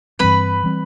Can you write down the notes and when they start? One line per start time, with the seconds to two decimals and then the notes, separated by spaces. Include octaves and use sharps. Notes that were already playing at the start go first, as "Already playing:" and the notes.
0.19 G2 E3 G3 C4 B4 B5
0.63 E3 G3 C4